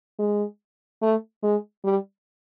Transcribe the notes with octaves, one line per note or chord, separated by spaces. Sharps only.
G#3
A3
G#3
G3